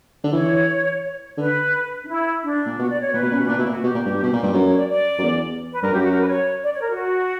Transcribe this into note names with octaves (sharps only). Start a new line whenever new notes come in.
D3
E3 C#5
D3 B4
D4
E4
D4
A#2
B2 F#4
D5
C#5
A#2 B4
B2
A#2 C#4
B2
A#2 D4
B2 E4
A#2
F#4
B2 G4
A#2
G2
B2
A#2
G2
F#2 B4
C#5
D5
D5
F#2
E2
B4
G2 A#4
F#2 G4
F#4
A#4
B4
C#5
D5
C#5
A#4
F#4